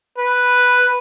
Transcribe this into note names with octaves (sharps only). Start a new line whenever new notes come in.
B4